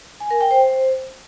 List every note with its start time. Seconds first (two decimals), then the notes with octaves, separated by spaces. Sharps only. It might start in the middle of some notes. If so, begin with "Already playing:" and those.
0.20 G#5
0.31 A#4
0.41 G5
0.51 C5